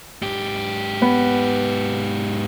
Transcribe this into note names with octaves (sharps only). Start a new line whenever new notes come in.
G#2 G4
B3